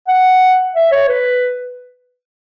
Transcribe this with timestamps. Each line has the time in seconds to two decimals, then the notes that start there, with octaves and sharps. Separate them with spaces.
0.08 F#5
0.75 E5
0.92 C#5
1.08 B4